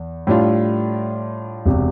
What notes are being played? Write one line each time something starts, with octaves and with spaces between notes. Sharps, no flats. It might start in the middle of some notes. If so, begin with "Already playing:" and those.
Already playing: E2
A2 G3 D4 F4
E1 C3